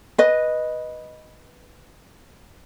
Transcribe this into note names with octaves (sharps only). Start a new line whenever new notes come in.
B4 D#5